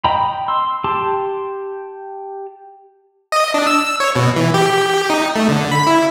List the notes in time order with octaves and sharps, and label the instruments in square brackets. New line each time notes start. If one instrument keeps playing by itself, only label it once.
[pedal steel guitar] D#5 G5 A#5 B5
C6 E6
G4 A5 C6 D6
[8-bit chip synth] D#5
D4
E6
C#5
B2
E3
G4
D#4
A3
D3
B5
E4